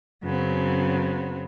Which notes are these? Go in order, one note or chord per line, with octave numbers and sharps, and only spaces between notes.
F#2 C#3 F#3 B3 C4